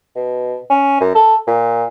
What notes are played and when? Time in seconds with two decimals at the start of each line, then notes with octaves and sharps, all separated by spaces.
0.16 B2
0.70 C#4
1.01 F#2
1.15 A4
1.47 A#2